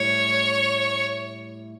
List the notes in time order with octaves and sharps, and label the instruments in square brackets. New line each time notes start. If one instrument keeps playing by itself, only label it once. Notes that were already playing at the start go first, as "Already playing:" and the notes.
Already playing: [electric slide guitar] A2 G3 E4 [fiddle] C#5